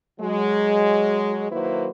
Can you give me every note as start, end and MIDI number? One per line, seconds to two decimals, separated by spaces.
0.20 1.47 54
0.20 1.47 56
1.51 1.89 51
1.51 1.89 54
1.51 1.89 58
1.51 1.89 64
1.51 1.89 71
1.51 1.89 72